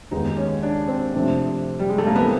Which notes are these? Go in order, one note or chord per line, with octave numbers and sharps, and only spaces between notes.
D#2 D#3 G#3 B3 D#4
C#4
D4
C4
C3 F3 A3 D4
G3
G#3
A3
A#3
C3 E3 G3 B3 C4